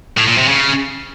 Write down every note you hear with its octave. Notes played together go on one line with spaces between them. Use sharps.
A2
A#2
C3
C#3